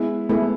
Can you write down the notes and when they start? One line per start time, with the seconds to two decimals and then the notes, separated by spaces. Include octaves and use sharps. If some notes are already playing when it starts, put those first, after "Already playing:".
Already playing: G#3 B3 E4
0.29 G#3 A3 B3 E4